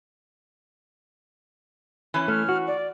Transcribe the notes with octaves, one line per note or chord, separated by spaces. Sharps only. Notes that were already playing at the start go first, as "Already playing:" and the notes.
E3 C#4
A3 F6
F#4
D5